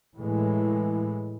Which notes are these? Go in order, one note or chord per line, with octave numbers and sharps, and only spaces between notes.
A2 E3 G#3